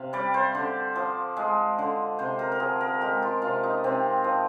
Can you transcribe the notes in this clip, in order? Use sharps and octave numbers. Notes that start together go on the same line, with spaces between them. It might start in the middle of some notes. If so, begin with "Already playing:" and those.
Already playing: C3 F5
G3 D5
C5
D3
F3
G#3
D3
C3 C5
A#4
A#4
F3 G#4
A#4
G#3 G4
F4
C3 F4
D#4
C3 C4
F3